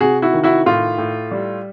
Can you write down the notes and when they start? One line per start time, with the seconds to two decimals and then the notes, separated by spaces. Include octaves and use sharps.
0.01 C3 F#4 G#4
0.22 E4 F#4
0.33 D#3
0.44 E4 F#4
0.66 A2 F4
0.98 A2
1.31 G3